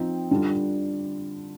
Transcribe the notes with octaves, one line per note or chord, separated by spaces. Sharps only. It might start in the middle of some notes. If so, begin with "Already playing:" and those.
Already playing: F3 C4 D#4
D3 G3 D4 F4